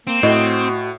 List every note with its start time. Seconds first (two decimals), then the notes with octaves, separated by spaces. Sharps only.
0.07 A#3 C4
0.23 A2 F#4 D#5